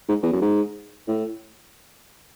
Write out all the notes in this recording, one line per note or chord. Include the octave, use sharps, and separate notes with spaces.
G#2
E2
F#2
G#2
A2